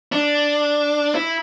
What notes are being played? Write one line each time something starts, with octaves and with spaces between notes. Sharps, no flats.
D4
E4